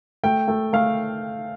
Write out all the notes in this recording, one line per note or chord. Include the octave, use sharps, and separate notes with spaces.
A3 G5
A3
A3 F5